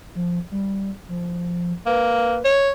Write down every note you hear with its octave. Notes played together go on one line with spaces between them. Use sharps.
F3
G3
F3
A#3 B4
C#5